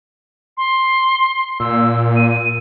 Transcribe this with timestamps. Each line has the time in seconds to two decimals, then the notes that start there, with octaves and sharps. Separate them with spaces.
0.57 C6
1.60 A#2 E6
2.16 D#7